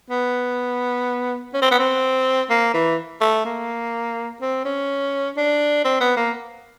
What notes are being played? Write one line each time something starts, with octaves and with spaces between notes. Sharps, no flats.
B3
C#4
C4
B3
C4
A#3
E3
A3
A#3
C4
C#4
D4
C4
B3
A#3